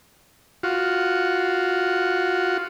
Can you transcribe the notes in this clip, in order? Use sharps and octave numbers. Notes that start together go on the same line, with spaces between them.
F4 F#4